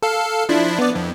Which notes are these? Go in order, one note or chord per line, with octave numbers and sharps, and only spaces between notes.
A4 F5
F3 D4 E4
B3 D5
F2